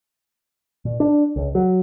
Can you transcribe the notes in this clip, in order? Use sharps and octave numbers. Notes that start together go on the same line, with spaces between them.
A#2
D4
C#2
F#3